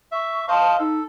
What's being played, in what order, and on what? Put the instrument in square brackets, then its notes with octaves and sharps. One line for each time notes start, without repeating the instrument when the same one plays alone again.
[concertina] E5 [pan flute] C#6
[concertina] C5 D#5 F5 [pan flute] A5
[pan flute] D#4 [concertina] A4